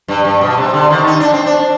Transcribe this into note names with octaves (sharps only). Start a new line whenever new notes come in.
G2
G2
B2
C3
D3
D#3
D#4
D4
C4
D4